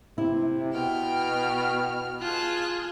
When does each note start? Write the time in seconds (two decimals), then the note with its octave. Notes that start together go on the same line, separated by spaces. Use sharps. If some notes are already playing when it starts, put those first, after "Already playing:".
0.18 C3 E4
0.74 B2 G5 F6
2.21 F4 G#4 A5 F#6